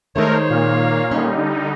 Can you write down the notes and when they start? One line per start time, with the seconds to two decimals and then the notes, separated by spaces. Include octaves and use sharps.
0.16 D#3 G#3 A3 D#4 A#4 C5 C#5
0.50 A#2 A#3 F5
1.11 D3 G3 C#4 D#4